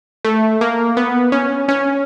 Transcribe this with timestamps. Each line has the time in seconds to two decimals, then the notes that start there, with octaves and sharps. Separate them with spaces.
0.25 A3
0.61 A#3
0.97 B3
1.32 C#4
1.68 C#4